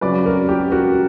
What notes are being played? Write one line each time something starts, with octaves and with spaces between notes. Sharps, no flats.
C#3 F#3 B4 D5
F#4 A#4
G4
F#4 A#4